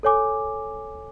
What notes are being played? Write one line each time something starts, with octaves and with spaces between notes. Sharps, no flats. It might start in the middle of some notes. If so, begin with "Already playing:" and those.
A4 C#5 G#5 D6